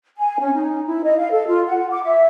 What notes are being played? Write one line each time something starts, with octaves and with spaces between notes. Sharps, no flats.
G#5
C#4
D#4
E4
D#5
F5
A4
F4
F#5
D6
E5